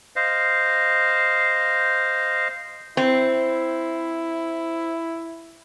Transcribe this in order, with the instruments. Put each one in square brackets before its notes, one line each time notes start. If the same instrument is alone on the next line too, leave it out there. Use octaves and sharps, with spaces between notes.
[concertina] C5 D#5 F5
[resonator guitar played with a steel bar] C4 [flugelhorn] E4